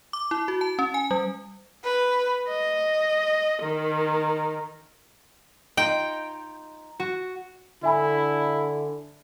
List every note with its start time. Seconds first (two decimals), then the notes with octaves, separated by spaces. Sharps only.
0.13 D6
0.31 E4
0.48 F#4
0.61 A5
0.79 C#4
0.94 G#5
1.11 G3
1.83 B4
2.48 D#5
3.62 D#3
5.77 D#4 F4 G5
7.00 F#4
7.83 D3 E4 E5 G#5 B5